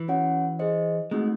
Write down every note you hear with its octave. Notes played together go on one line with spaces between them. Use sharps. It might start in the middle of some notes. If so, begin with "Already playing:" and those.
Already playing: E3
C#4 F#4 C#5 F#5
G#4 C5 D#5
G#3 A3 C4 D#4 F#4